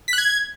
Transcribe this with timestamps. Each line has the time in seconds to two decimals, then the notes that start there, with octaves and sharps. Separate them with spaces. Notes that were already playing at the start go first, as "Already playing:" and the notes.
0.08 B6
0.13 F#6
0.18 G#6